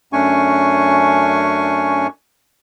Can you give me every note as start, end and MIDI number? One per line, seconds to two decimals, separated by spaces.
0.13 2.07 42
0.13 2.07 57
0.13 2.07 61
0.13 2.07 62
0.13 2.07 80
0.13 2.07 85